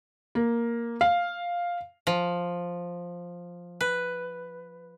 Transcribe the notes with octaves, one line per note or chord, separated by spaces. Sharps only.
A#3
F5
F3
B4